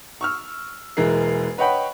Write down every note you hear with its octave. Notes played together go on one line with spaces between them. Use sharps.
C#6 E6 F6
E1 E3 G#3 A#3 A#4 C7
B4 C#5 D#5 F#5 G5 B5